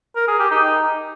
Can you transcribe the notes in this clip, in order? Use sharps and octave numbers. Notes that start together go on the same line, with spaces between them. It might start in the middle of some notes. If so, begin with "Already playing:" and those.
A#4
G#4
G4
D#4